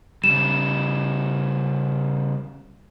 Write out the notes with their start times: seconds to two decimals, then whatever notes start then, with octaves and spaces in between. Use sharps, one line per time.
0.24 C#3 G3 E7